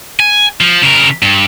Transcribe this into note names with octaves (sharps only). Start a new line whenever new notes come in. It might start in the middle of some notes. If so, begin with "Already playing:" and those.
G#5
F3
C#3 A#4
G2